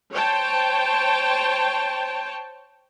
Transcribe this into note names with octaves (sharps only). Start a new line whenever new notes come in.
C5 C#5 G5 A5